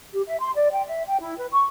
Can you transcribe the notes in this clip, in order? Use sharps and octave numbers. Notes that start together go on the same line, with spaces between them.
G4
E5
C6
D5
G5
E5
G5
E4
B4
C#6